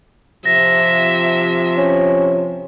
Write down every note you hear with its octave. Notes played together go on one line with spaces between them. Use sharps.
C3 F3 E5 A#6
C#4